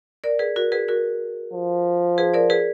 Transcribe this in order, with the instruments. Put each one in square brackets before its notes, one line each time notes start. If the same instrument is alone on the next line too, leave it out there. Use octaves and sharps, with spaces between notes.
[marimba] A#4 D5
G#4 B4
F#4 A#4
G#4 B4
F#4 A#4
[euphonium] F3
[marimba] G#4 B4
A#4 D5
G#4 B4